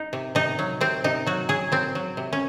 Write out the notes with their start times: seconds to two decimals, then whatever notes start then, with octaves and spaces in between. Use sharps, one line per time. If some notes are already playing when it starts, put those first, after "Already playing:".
Already playing: D#4
0.13 C3
0.35 C3 D#4
0.59 F#3
0.81 C3 C4
1.04 C3 D#4
1.26 F#3 F#4
1.49 F#3 G#4
1.72 F#3 C4
1.95 F#3
2.17 C3
2.33 C#4